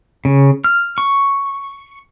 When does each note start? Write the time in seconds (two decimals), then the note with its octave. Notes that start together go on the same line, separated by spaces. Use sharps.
0.25 C#3
0.64 F6
0.98 C#6